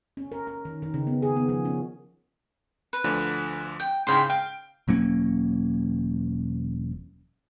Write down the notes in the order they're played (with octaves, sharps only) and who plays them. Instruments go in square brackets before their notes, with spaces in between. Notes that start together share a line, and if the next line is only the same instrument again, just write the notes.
[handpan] C#4
A#4
A#4
D#3
D#3
C#3
B3
G#4
B3
F3
C#4
[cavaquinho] B4
[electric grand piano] D2 D3 F3
[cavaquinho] G5
[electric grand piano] G#2 C#3 [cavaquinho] E4 G5 C6
[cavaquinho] F5 [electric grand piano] G5
[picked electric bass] E1 F#3 A#3 C#4